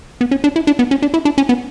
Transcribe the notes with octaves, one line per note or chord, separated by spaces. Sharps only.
B3
C#4
D4
E4
D4
B3
C#4
D4
E4
D4
C#4
B3